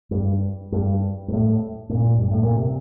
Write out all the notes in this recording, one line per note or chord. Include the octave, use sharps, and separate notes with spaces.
G2
G2
G2
A2
A2
A#2
G2
A2
A#2
C3